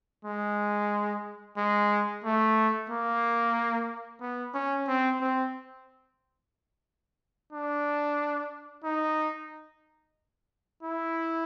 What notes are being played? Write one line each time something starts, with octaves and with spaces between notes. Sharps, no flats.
G#3
G#3
A3
A#3
B3
C#4
C4
C4
D4
D#4
E4